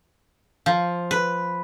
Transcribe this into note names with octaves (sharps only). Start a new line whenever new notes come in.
F3
B4